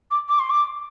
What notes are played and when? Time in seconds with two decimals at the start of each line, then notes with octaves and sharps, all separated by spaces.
0.11 D6
0.28 D6
0.39 C6
0.49 D6